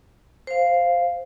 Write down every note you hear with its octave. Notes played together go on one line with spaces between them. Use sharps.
C5 F5